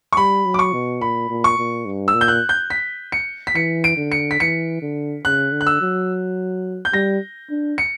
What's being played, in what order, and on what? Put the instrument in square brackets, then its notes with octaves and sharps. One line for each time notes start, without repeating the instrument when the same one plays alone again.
[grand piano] C#6
[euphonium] G3 [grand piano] B5
[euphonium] F#3
[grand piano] D6
C#6
[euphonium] B2
[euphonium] A#2 [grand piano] B5
[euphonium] A#2
[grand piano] C#6
[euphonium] A#2
G2
[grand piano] E6
[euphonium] A#2
[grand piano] G6
F#6
G6
B6
C#7
B6
[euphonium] E3 [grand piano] C#7
[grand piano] D7
[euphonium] D3
[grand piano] C#7
B6
[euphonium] E3 [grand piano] C#7
[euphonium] D3
[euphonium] C#3 [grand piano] F#6
[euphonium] D3
[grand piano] F#6
E6
[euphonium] F#3
[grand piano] G6
[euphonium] G3 [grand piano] A#6
[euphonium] D4
[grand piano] C#7